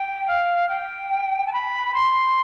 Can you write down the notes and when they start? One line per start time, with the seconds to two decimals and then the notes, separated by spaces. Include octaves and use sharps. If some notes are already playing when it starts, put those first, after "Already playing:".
Already playing: G5
0.28 F5
0.69 G5
1.47 A5
1.53 B5
1.94 C6